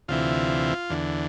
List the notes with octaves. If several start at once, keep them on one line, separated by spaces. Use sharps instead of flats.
D2 C3 E3 F4
E2 D3